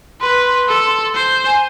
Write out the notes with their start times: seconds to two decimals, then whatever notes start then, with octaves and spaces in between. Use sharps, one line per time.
0.21 B4 C6
0.68 A4
1.15 C5
1.46 G#5